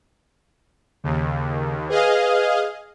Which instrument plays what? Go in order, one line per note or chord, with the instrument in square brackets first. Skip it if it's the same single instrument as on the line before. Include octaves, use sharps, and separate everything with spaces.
[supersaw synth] D#2 [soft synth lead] C#3
[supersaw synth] G#4 D#5 F5 [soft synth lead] B4